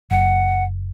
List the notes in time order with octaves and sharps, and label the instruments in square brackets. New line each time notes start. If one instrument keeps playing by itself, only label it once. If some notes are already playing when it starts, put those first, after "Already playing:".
[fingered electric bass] F#1 [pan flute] F#5